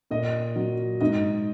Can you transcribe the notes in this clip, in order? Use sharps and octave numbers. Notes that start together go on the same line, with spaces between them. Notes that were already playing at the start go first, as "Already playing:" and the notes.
A#2 D#5
F#3
G#2 D#5